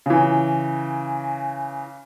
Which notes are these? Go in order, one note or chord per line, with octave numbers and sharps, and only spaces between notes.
C#3 E3